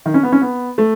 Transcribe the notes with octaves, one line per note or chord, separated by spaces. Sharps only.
D#3
C#4
B3
C#4
B3
A3